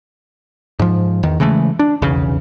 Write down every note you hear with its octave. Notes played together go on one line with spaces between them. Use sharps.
G#2 F3
E2 D#3
C#3 E3 G#3 A3
D4
F1 B1 E2 C#3